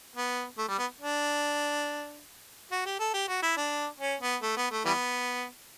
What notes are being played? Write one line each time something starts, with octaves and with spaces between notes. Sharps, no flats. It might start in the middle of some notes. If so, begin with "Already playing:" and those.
B3
A3
G3
B3
D4
F#4
G4
A4
G4
F#4
E4
D4
C#4
B3
A3
B3
A3
E3 G3 B3